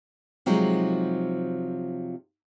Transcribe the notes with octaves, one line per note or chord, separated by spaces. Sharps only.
C3 F3 F#3 G#3 D#4